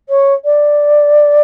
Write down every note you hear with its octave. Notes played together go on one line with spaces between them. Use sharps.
C#5
D5